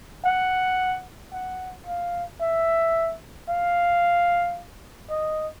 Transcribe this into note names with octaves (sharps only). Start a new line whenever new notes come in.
F#5
F#5
F5
E5
F5
D#5